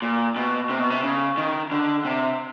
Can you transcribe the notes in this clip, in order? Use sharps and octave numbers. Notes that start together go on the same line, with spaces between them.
A#2
B2
C3
B2
C3
C#3
D#3
D3
C3